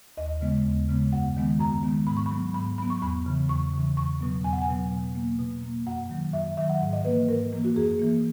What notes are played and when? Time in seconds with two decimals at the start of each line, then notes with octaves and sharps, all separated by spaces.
0.17 D#2 D#5
0.41 C#3 G#3 B3
0.65 D#2
0.89 C#3 G#3 B3
1.12 F#2 F#5
1.37 D#3 G#3 B3
1.60 F#2 A#5
1.83 D#3 G#3 B3
2.07 G#2 B5
2.17 C#6
2.26 B5
2.31 F#3 B3
2.54 G#2 B5
2.78 F#3 B3 B5
2.90 C#6
3.02 E2 B5
3.26 C#3 E3
3.49 E2 C#6
3.74 C#3 E3
3.97 E2 C#6
4.21 B2 F#3 B3
4.44 E2 G#5
4.53 F#5
4.62 G#5
4.68 B2 F#3 B3
4.92 B2
5.15 A#3
5.39 B2
5.63 A#3
5.86 F#2 F#5
6.10 D#3 F#3
6.33 F#2 E5
6.57 D#3 F#3 E5
6.69 F#5
6.82 G#2
6.93 D#5
7.05 E3 A#3 B4
7.29 G#2 A#4
7.52 E3 A#3
7.64 F#4
7.76 F#2 G#4
7.99 E3 A#3